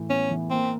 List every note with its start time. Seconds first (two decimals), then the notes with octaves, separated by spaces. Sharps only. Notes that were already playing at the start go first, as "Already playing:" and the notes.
Already playing: A2 E3
0.10 B3 C#4
0.30 E3
0.50 A#3 C4